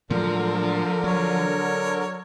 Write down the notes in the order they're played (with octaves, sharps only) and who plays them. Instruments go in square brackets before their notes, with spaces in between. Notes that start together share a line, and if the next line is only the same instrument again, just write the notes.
[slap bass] A2 F#3 G#3 [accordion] D3 A#4 [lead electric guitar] F3
[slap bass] F#3 [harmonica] C#5